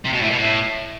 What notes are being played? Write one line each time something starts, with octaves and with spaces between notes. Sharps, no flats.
C3
B2
A2
B2
A2